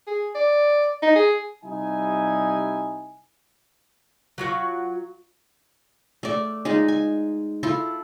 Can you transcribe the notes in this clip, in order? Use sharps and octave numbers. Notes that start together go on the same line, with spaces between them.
G#4
D5
D#4
G#4
C3 G3 D#4 E4 G#5
F#3 F4 F#4
A3 D5
G#3 D#4 F4
G#5
E4 F4 A4